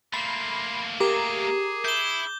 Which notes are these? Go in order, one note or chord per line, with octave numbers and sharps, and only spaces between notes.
A3 A#3 B5 C6
G4 G#4 A#4 A#5 D6
E4 G6 G7